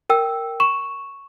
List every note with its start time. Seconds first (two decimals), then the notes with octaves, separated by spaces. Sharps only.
0.10 A#4 G5 E6
0.60 C#6 E7